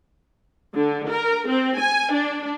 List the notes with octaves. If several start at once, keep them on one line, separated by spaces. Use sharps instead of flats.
D3
A#4
C4
G#5
D4